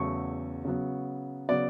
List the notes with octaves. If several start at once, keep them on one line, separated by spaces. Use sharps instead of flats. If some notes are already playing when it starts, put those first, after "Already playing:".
Already playing: E2 C#3 F#3 A3 C#6
C#3 F#3 B3
C#3 F#3 B3 D5